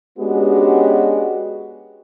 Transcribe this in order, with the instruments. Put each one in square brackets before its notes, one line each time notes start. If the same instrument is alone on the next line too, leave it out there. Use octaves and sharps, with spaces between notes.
[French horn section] G#3 B3 C#4 D4 F#4 G4